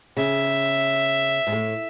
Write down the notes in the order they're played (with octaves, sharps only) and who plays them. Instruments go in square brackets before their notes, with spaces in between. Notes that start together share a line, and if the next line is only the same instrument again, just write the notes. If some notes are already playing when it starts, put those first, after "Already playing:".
[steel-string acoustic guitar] C#3 [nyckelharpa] E5
[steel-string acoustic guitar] G#2
A2